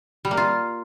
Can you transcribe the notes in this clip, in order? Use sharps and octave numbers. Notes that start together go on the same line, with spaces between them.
G3
A#3
F4